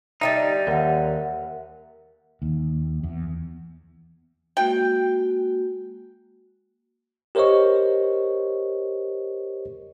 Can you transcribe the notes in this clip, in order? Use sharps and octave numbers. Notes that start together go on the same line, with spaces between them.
D3 F#3 G3 D#4 E5 G5 A6
D#2 A#4 E5 F#5
D#2
E2
G#3 A#3 F#4 G5
G4 A#4 C5 C#5 D#5 C#6